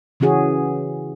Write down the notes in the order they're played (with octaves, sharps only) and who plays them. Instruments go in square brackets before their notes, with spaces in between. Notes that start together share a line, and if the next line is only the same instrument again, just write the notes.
[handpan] C#3 E3 C#4 F#4 G#4